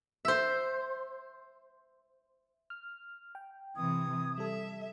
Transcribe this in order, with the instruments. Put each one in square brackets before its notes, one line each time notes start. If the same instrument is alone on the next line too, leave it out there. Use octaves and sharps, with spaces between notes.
[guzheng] C5 E5
[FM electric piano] F6
G5
[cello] C3 E3 [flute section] D#6 G#6
[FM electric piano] G3 A4 [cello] E5